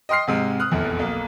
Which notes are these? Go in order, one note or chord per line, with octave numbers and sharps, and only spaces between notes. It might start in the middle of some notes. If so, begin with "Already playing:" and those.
D#5 G5 C6 F6 C7
G#2 C3 G#3
D#6 F6 F#6
F1 A#1 E2
B1 A#3